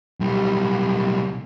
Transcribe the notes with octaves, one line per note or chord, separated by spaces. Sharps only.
B1 G3